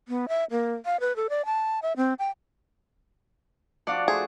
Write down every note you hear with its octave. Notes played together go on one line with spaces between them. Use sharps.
B3
E5
A#3
F5
B4
A4
D5
A5
E5
C4
G5
F3 D4 F#4 D5 F5 F#5
A3 G#4 C5